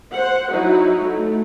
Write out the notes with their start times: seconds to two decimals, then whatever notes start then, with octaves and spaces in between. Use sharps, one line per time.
0.12 C5 F#5
0.52 F#3 D#4 E4 F#4
1.00 A3